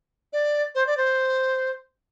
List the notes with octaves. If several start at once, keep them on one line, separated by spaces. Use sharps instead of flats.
D5
C5
D5
C5